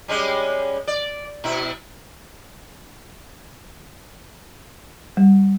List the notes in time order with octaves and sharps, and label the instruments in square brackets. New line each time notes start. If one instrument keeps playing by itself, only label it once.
[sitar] G3 G#3 C#4
D5
B2 E4
[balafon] G3